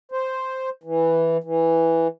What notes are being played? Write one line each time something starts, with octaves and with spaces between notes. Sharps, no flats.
C5
E3
E3